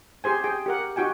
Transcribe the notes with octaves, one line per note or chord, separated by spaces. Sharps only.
G4 G#4 C5 G#5
G#4 G5
G4 A#4 F#5
D#4 F#4 G4 G5 G#5